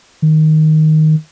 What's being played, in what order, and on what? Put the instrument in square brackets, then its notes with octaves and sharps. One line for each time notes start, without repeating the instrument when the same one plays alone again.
[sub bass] D#3